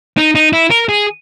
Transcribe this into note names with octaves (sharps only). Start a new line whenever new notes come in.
D#4
D#4
E4
A#4
G#4